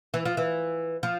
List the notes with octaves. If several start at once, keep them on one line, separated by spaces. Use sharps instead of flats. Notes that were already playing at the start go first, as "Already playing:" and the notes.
E3
F3
E3
F3